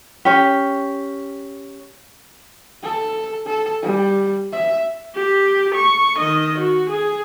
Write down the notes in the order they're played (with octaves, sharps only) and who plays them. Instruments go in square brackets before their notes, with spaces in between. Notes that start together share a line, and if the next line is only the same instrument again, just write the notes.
[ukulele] C#4 G4
[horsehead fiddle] A4
A4
G3
E5
[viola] G4
C#6
D#3 D#5
F#4
G#4